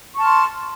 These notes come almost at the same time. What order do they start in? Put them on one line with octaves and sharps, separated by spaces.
C#6 A5 F6 C6